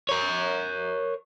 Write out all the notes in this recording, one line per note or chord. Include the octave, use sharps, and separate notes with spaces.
A#4 C#5